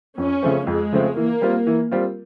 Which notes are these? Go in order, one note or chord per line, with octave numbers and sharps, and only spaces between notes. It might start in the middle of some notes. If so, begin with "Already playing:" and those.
F2 C#4
C#3 F3 A3 C4
F2 G#3
C#3 F3 A3 C4
E3 A#3
G3 C4 F4
E3
G3 C4 F4